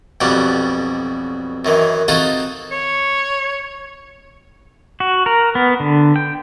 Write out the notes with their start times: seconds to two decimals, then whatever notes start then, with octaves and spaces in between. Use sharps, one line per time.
0.21 B1 F2 B2 G3 B3 D5
1.65 F#2 D#3 E3
2.08 C4 D#4 F4 F#4 G#4 A4
2.71 C#5
5.00 F#4
5.26 A#4
5.55 B3
5.80 D3
6.16 G5